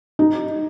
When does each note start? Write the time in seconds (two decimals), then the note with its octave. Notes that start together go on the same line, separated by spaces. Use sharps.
0.19 D#4